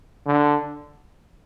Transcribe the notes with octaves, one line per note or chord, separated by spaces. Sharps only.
D3